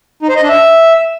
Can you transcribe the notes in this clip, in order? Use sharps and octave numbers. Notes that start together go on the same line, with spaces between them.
D#4
C5
D#5
D4
E5